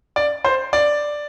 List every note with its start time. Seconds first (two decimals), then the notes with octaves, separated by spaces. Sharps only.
0.16 D5
0.44 C5
0.73 D5